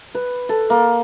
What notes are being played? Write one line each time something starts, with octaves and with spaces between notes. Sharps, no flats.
B4
A4
A#3